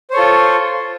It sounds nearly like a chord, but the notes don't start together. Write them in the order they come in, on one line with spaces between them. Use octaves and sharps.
C5 C#5 A4 F4